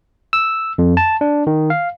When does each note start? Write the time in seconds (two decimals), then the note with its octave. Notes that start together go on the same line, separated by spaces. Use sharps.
0.33 E6
0.78 F2
0.97 A5
1.21 D4
1.47 D#3
1.70 F5